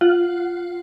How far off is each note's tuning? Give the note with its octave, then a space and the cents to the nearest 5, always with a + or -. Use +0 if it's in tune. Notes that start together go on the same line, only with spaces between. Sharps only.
F4 +0 F#5 +5